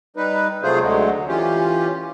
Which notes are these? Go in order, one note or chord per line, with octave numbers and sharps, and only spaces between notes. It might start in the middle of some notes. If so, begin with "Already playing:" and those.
G3 D#4 B4
C3 F#3 A3 F4 G#4 C5
D2 D3 F#3 G#3
E3 C#4 F4 G4